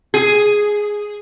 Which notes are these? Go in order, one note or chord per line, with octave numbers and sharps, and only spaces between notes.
G#4